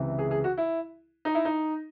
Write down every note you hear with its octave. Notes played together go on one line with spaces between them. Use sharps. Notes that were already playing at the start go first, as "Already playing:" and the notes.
Already playing: C#2 C3 E3
G#4
G#4
F#4
E4
D#4
E4
D#4